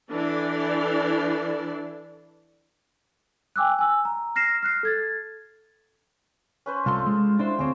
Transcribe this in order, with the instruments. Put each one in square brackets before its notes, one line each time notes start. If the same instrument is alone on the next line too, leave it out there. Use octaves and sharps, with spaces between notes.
[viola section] E3 D4 A4 D5
[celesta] G5 G#5 D6 E6 F#6
G#5 E6
A#5
F6 A#6 C7 E7
F6 F#6 C7
A4 G#6 A6
[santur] C#4 B4 C5
[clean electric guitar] C2 C6 [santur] F4 A4
[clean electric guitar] G#3
[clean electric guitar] D4 E4 C5 [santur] C6
[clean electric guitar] D2 C4 [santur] G#4 C#5